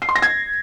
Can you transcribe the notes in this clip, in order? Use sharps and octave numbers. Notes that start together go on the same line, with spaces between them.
C7
C6
A#6
G#6